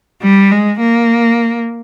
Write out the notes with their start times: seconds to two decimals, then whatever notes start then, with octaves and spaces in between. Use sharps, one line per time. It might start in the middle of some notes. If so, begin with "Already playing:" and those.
0.22 G3
0.51 G#3
0.80 A#3